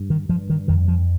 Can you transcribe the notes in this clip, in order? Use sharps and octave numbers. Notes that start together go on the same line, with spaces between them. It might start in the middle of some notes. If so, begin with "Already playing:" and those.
Already playing: G2
D#3
G2 F3
D#3
F2 D#3
F3